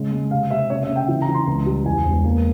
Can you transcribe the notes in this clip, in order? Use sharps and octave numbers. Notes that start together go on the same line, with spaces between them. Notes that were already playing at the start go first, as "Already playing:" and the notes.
Already playing: C#3 G#3
G#3
C3 F5
C3 E5
C#3 C#5
E5
C#3
G5
E3
A#5
E3
C6
C#2
G3
E2 G#5
E1
A#3